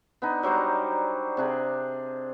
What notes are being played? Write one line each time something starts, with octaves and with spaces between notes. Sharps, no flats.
B3 D4 D#4
F#3 G3 C5 A#5
C3 D4 G#4